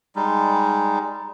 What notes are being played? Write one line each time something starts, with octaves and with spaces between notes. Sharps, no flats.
G3 G#3 D#4